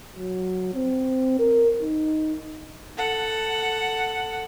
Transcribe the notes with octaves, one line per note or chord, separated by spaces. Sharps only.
F#3
C4
A#4
D#4
A4 F#5